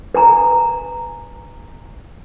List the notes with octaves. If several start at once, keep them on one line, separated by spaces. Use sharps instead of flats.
B4 G#5 A#5